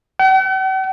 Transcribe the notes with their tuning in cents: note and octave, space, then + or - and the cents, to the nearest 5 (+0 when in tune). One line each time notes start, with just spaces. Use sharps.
F#5 +45